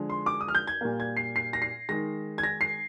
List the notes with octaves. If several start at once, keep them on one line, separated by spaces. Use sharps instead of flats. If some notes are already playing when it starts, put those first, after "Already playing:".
Already playing: D3 F3 G#3
C6
D6
D#6
F6
G6
G#6
A#2 G3 A#3
G#6
C7
C7
A#6
C7
D#3 G#3 A#6
G#6
A#6
C7